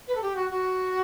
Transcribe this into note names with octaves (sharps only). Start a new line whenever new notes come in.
B4
A4
G4
F#4
F#4